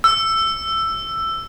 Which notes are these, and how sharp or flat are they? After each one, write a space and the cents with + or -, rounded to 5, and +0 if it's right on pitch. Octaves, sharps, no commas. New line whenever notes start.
E6 +10